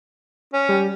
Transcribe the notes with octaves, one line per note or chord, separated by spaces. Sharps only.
C#4
G3